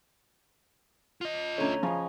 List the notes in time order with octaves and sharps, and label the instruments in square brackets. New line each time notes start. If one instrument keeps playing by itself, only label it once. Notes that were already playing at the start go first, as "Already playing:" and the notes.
[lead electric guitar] F4 D#5
[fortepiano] D3 A3 C#4 [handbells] C#5 A#5
[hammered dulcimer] C#3 D#5 [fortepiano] F3